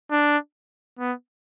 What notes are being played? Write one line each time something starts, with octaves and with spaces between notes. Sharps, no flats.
D4
B3